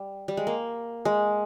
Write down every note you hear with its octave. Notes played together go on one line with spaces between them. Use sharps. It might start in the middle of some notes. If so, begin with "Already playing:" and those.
Already playing: G3
G3
G#3
A#3
G#3